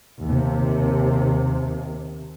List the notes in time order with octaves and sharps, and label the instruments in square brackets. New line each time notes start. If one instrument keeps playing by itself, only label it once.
[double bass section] D#2 C3